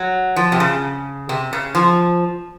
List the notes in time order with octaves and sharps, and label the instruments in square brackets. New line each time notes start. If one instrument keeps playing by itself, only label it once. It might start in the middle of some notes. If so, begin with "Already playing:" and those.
Already playing: [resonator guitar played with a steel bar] F#3
F3
C3
C#3
C3
C#3
F3